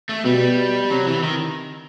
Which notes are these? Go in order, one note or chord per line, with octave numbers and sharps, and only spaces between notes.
A3
B2 G3
C3 F#3
E3
D#3